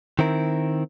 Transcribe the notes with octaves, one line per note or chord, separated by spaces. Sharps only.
D#3 C4 E4 A#4